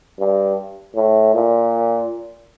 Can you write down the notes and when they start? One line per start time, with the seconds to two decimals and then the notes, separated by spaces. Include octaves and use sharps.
0.19 G2
0.95 A2
1.34 A#2